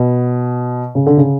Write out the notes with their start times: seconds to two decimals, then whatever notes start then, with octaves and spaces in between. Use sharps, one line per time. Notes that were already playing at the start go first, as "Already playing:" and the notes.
Already playing: B2
0.95 C#3
1.06 D3
1.17 C#3